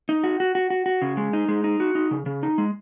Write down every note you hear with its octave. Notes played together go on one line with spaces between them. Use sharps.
D#4
F#4
F#4
F#4
F#4
F#4
C#3
G#3
D#4
G#3
D#4
F#4
D#4
C#3
C#3
D#4
G#3